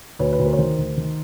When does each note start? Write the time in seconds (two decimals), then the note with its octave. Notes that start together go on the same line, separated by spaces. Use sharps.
0.19 D2 B4 C#5
0.32 B4 C#5
0.39 D2
0.46 A#4 C5
0.53 C#5
0.58 D#3 A#4 C5
0.78 D2
0.97 D#3